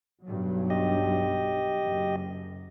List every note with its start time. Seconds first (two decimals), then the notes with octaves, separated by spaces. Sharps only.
0.24 B1 G2 F#3
0.70 G4 D#5
1.86 F#1 F#2